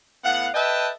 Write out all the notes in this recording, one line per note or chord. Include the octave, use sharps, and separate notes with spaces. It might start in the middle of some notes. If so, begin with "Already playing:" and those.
A2 B3 F5 F#5
A4 B4 D#5 E5 G5 A5